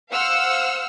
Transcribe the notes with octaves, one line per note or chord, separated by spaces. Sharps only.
C5 F5 F#5 E6 F6 C#7